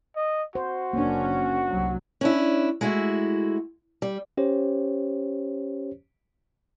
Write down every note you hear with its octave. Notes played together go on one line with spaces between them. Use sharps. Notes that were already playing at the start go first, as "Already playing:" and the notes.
D#5
F#4 C5
F#1 A#3 C#4 D4
C2 F#3
C#4 D4 E4
G#3 A3 E4 F#4
G3
C#4 G4 C5 C#5